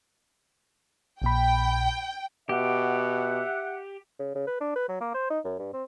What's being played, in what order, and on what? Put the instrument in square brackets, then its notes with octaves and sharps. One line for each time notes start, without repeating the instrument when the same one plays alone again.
[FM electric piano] A#1 A#2 B5 [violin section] G5
[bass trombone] B2 [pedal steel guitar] G4 [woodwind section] E5 F#5
[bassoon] C#3
C#3
B4
D4
B4
F#3
A#3
C5
D#4
F#2
G2
C4